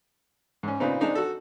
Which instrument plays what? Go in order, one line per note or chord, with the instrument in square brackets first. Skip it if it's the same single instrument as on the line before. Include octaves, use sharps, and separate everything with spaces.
[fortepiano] G#2 C#4
A#2 C#3 B3 C4 D#4
G#3 C4 D4 D#4 C5
F#4 A4